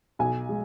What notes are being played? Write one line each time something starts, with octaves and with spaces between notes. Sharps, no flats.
B1 G#5
G#3